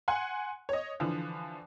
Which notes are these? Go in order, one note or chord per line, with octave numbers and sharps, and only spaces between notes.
F#5 G#5 C6
C#5 D#5
D3 E3 F3